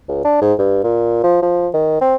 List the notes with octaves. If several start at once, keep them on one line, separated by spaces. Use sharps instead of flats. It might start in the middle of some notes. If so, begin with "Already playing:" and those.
C#2
D4
G#2
G2
A#2
F3
F3
D#3
C4